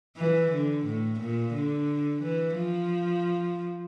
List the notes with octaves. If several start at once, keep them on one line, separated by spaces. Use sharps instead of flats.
E3
D3
A2
A#2
D3
E3
F3